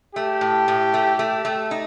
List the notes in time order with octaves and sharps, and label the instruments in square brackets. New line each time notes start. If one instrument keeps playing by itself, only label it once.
[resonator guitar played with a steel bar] A3 [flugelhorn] G4
[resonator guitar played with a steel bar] A2
A2
A3
A3
A3
D#4